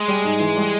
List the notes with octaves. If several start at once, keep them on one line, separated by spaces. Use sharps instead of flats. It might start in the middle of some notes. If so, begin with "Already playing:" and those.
Already playing: G#3
G3
G#2
E3
G3